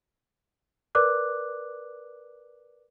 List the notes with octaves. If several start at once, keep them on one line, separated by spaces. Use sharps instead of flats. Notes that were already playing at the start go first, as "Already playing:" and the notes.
A#4 B4 D5 D6 F#6